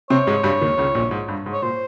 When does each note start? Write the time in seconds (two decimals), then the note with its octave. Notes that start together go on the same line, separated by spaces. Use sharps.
0.10 C3 C4 C#5
0.27 G#2 G#3
0.44 G2 G3
0.61 D#2 D#3
0.78 C#2 C#3
0.95 A#1 A#2
1.11 G#2
1.28 G2
1.46 G#2
1.53 C#5
1.62 A#2 C5